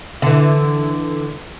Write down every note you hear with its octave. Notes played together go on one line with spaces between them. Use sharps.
D3 E3